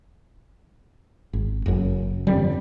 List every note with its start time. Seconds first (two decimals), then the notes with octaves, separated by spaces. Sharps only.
1.33 G#1
1.66 F#1 F#2
2.27 G1 F2 G3